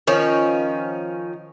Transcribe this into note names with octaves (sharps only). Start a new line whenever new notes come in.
D#3 F3 C#4